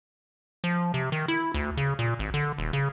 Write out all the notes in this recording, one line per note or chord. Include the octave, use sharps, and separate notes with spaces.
F3
C3
D#3
E4
D2
C#3
A#2
G#1
D3
D#1
C#3